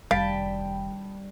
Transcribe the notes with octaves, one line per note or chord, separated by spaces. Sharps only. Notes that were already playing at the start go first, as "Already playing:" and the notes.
F1 D#3 G3 F5 G5 A5 B5